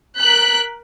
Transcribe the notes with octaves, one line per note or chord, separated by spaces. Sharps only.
A#4 F#6 B6